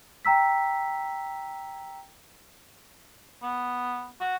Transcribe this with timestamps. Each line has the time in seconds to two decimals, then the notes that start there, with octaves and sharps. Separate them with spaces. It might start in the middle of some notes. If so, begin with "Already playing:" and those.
0.25 G5 A#5 E6 B6
3.42 B3
4.20 F#4